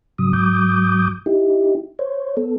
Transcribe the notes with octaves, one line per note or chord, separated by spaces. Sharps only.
G#2 C#3 F#3 D#6
G#2 F#3 D6 D#6 G6
D#4 E4 G4
C5 C#5
B3 A4